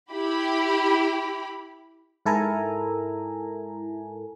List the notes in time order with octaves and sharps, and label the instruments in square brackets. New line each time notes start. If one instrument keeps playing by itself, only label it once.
[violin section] E4 G4 B5
[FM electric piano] G#2 E4 A4 A#4 G#5 A#5